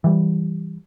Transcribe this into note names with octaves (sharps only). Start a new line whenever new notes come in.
E3 G3